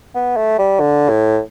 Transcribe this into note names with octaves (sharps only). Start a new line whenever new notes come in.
B3
A3
G3
D3
A2